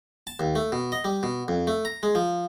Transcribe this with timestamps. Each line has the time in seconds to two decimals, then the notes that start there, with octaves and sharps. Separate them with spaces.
0.27 A5
0.40 D#2
0.56 A3
0.72 B2
0.92 D#5
1.04 G3
1.23 B2
1.48 F2
1.67 A3
1.85 A#5
2.03 G#3
2.15 F3